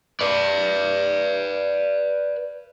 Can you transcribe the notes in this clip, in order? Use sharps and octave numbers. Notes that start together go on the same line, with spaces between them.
B4 D5